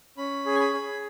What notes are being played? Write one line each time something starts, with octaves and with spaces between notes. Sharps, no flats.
C#4 B5
G#4
G#5
B5
G#4